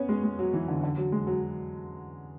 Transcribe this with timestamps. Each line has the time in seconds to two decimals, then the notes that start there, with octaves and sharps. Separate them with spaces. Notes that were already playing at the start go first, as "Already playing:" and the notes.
Already playing: B3 C#4
0.09 G#3
0.23 G#3
0.39 F#3
0.54 E3
0.68 D3
0.83 D3
0.97 F#3
1.12 G#3
1.27 F#3